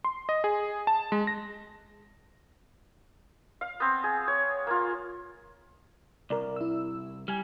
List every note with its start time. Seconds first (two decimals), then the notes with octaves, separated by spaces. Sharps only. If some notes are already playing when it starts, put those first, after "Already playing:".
0.04 C6
0.29 D#5
0.44 G#4
0.87 A5
1.12 G#3
1.27 A#6
3.61 F5
3.80 B3 C4
4.04 G#4
4.27 C#5
4.67 A#3 F4
6.30 C2 A#4 D5
6.56 E4 E6
7.28 G3 G#5 F6